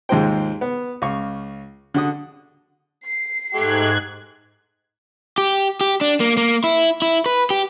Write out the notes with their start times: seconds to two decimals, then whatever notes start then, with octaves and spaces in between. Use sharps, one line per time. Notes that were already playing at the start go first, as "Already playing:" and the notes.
0.09 D#2 G#2 G#3 F4 C5 G5
0.61 B3
1.02 C#2 F5 C#6
1.94 D3 F#4 D#6
3.05 C7
3.54 G#2 A3 G4 F#6 G#6
5.38 G4
5.81 G4
6.01 D4
6.20 A#3
6.37 A#3
6.64 E4
7.02 E4
7.26 B4
7.50 G4